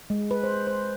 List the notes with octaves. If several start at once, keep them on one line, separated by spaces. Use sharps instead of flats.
G#3
B4
C5
C5